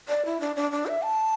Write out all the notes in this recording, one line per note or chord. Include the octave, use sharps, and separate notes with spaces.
D5
E4
D4
D4
D4
E5
A5